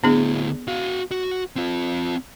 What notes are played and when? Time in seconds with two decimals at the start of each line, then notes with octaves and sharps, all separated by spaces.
0.04 D2 B3 D4 E4 G#4
0.68 F#4 F5
1.11 F#4
1.56 C4 F4